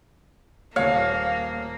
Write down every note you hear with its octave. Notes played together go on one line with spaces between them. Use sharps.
D#1 A#3 C#5 F5